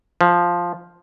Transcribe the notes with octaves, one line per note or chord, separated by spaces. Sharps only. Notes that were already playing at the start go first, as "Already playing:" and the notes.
F3